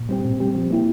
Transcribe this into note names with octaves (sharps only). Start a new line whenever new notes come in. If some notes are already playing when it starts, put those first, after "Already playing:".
Already playing: A#2
G3 C4 G4
A#2
G3 C4 G4
F3
A#3 E4 G4